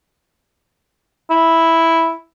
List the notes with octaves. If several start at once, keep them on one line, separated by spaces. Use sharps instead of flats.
E4